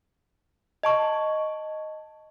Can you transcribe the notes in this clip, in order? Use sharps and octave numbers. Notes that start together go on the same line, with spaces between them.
D#5 A5 C#6